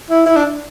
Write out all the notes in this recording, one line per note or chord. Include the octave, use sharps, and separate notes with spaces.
E4
E4
D4